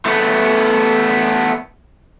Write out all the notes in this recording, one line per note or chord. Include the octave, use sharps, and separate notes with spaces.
A3 B3